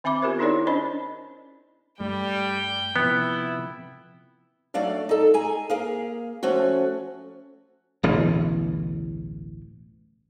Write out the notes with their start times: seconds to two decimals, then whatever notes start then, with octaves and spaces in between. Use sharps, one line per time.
0.04 D#3 C4 E5 B5 D6
0.22 B3 F4 G4 A#4 C5
0.39 D#4 E4 G#4 A#4 C#5 D5
0.67 C#4 D4 C5 D#5 B5
2.00 G2 G3 A3 G5
2.96 C3 F3 B3 E4
4.74 F#3 A3 D4 D5 F5
5.09 D#4 A4
5.34 G#4 G#5 A#5
5.70 A#3 G#4 F5
6.43 F3 A3 C#4 F#4
8.03 D1 A1 B2 E3